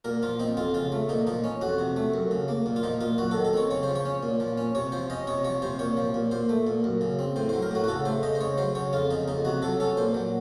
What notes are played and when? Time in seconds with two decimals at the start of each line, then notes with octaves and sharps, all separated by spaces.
0.05 A#2 A#4
0.22 F3 F4
0.39 C4 D#4
0.57 F2 F4
0.74 C#3 F4
0.92 A3
1.09 A#2 D#4
1.27 F3 D#4
1.44 C#4
1.61 F2 F#4
1.79 C3
1.96 A3
2.14 F#2
2.31 C#3
2.48 A#3
2.66 A#2
2.76 F4
2.83 F3 D#4
3.01 A#2 F4
3.18 F#2 F#4
3.31 D#3 A4
3.44 A4
3.53 C4 C#5
3.71 C#3 C#5
3.83 C5
3.88 F3
3.96 C#5
4.05 C#4
4.23 A#2
4.40 F3
4.58 C#4
4.75 C3 C#5
4.92 F3 C5
5.10 C#4 D#5
5.27 C3 C#5
5.44 F3 C#5
5.62 C3 C5
5.79 A#2 C#5
5.97 F3
6.14 A#2
6.31 A#2 C5
6.49 A3
6.67 A#2
6.84 F#2
7.01 C#3
7.19 C4
7.36 A2 C5
7.49 F#3 C5
7.62 A#4
7.71 A2 F#4
7.84 F#4
7.88 C#3 A4
8.05 A3 C5
8.23 C#3 D#5
8.35 C5
8.41 C#3 C#5
8.58 F#3 C5
8.75 C#3 C#5
8.93 F2 F4
9.11 C#3 D#4
9.28 F2 D#4
9.45 C3 F#4
9.62 F#3 A4
9.80 C#4 A4
9.97 A#2 C5
10.14 F#3